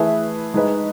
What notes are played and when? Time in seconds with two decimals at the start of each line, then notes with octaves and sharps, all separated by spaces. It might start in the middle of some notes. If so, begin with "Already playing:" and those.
Already playing: E3 A3 E4 G#4 B4
0.54 G#3 D#4 G#4 B4 D#5